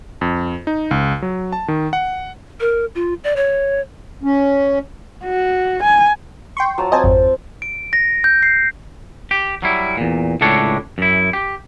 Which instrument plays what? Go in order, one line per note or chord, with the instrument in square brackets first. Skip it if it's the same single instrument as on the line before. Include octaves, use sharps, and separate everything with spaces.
[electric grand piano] F2
D#4
C#2
F#3
A5
D#3
F#5
[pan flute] A#4
F4
D5
C#5
[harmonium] C#4
[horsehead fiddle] F#4
G#5
[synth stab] G5 C6 C#6
[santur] F#3 F4 A5
[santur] C4 [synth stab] D#5 G#5 A5
[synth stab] G#1 F2
[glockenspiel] D7
A#6
G6
C7
[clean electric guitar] G4
F#3 G3 E4
E2 A#2
C#2 A2 D4 A4 C#5
F#2 E4
G4